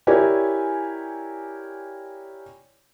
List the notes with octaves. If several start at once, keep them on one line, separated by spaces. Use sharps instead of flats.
E4 G4 A#4 C#5 D5 G#5